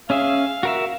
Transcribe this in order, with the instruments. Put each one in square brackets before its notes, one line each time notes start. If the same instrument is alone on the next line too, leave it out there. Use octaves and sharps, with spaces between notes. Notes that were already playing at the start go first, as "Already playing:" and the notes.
[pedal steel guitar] C#4 G#4 E5 [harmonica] F5
[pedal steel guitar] F#4 A#4 E5